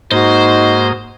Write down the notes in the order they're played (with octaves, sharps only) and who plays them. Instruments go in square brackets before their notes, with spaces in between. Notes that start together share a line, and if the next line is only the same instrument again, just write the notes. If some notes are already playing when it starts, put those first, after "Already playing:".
[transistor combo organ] G#2 A#3 D#6 [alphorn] D#4 [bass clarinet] F#4 [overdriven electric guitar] C5